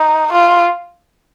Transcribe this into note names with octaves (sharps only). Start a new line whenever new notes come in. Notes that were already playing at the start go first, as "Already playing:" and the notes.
Already playing: D#4
F4